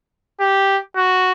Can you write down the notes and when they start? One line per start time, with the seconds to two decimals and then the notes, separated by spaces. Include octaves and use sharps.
0.40 G4
0.96 F#4